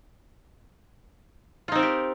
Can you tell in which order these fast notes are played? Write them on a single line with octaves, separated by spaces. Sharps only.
F4 D#4 C4 A#4 G4